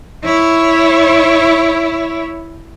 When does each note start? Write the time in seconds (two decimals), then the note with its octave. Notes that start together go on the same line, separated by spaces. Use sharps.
0.24 E4 C#5